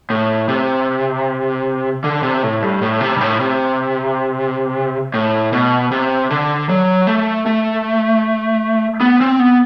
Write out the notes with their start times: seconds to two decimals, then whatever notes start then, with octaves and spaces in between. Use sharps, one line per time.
0.10 A2
0.49 C3
2.04 D3
2.23 C3
2.43 A2
2.62 G2
2.82 A2
3.01 C3
3.16 G2
3.21 A2
3.40 C3
5.14 A2
5.53 B2
5.91 C3
6.30 D3
6.69 F#3
7.07 A3
7.46 A3
9.01 B3
9.21 C4
9.39 B3